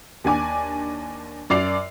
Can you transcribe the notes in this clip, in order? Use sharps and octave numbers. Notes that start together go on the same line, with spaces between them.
D#2 D4 G#5 D6
F#2 D5 D6 C7 F7